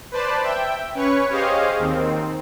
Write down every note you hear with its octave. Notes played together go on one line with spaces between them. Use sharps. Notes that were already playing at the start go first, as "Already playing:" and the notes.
B4 C5 D5 A5
E5 G5
C#4 B4 C#5 C#6
G4 G#4 C5 C#5 D#5 F5
D#2 D#3 C4